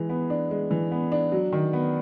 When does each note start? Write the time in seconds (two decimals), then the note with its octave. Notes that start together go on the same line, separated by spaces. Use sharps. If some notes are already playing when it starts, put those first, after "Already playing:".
Already playing: E3 G#3
0.09 B3
0.30 D4
0.51 G#3
0.71 E3
0.92 B3
1.12 D4
1.32 F#3
1.52 D#3
1.73 B3